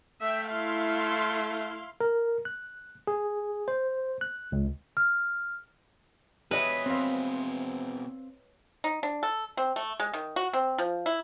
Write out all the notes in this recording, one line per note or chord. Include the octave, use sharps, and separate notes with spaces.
A3 E5 G5
E4 F5 C6
A#4
F#6
G#4
C5
F#6
C#2
F6
B2 G#4 B4 C#5 D#5 E5
C4 C5 F5
D#4
D4
A4
C4
A3
G#3
D#3
F#4
C4
F3
E4